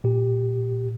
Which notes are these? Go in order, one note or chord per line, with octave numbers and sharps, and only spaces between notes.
A#2 G4